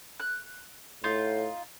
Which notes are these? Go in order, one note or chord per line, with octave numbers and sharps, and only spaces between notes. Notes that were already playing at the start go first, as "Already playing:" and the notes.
F#6
A2 D#4 F4